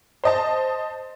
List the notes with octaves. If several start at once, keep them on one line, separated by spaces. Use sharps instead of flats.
C5 D#5 A5